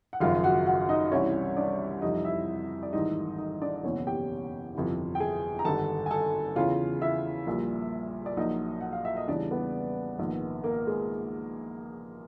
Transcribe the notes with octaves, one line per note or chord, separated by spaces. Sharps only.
F#5
G#1 F#2 C#3 F3 F4 F5
F#4 F#5
F#4 F#5
D#4 D#5
C2 C3 E3 G3 C#4 C#5
D4 D5
F2 C3 E3 G3 D#4 D#5
E4 E5
D5
A1 G#2 D#3 G3 D#4 D#5
D#4 D#5
D4 D5
D5
F#1 E2 B2 C#4 C#5
G4 G5
G1 F2 C3 E3
G5
G#4 G#5
A#5
G#1 G2 D3 A4 A5
G#5
A4 A5
E2 C#3 E3 F4 F5
E4 E5
A#1 A#2 G3
D5
A#1 A#2 F#3 D#4 D#5
F#5
F5
E5
D#5
E2 C#3 E3 G3 D4 D5
B3 B4
A#1 G#2 D#3
A#3 A#4
G#3 G#4